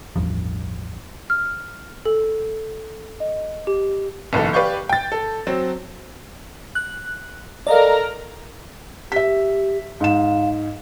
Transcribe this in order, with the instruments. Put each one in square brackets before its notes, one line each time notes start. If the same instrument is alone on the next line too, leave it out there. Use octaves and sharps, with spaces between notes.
[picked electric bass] A1 E2 G2 F3
[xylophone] F6
A4
D#5
G4
[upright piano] F#1 B1 E3 A4
G4 B4 D5 F5 C#6 G6
G5 A6
A4
F#3 C4
[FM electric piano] F#6
[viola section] A4 A#4 A#5 [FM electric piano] D5 D#5 F5
[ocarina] G4 [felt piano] E5 B6
[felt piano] G#2 E7 [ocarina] F5